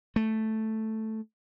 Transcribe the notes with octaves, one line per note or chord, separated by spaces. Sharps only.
A3